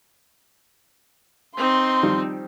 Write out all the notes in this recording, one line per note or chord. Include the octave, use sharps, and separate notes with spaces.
C4 D#4 C6
D#3 F3 G3